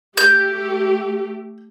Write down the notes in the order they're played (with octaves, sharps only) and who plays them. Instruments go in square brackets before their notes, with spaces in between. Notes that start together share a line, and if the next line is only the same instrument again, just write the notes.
[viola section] A3 G4 [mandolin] G6